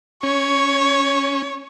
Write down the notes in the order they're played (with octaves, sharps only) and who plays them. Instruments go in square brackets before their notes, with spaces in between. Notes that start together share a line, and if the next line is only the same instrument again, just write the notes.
[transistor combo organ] C#4 [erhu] C#5